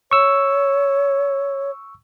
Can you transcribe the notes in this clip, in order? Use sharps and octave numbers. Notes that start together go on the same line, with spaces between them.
C#5 C#6 E6